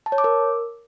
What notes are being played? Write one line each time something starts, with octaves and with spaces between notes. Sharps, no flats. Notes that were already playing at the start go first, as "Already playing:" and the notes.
A5
C#5
D6
A#4